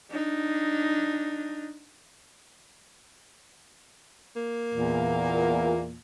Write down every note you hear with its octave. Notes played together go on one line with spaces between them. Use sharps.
D4 D#4
A#3
E2 A#2